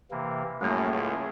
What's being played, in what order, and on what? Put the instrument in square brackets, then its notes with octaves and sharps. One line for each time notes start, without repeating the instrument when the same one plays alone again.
[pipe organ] C3 E3 A#3
[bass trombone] F#2 [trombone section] A2 [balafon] G3 A#3 [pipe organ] G#4
[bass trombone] C#2